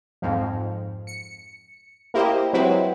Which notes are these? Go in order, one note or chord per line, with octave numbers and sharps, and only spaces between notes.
F2 G#2 F3
C#7
A#3 E4 G4 C5 D#5
F#3 G#3 C4 E4 B4